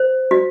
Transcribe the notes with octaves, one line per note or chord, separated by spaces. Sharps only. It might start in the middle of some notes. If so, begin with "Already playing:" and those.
Already playing: C5
F#4